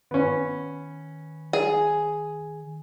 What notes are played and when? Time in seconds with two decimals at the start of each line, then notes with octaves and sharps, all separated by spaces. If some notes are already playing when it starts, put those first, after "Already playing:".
0.11 D#3 B3 C#4
1.53 G#4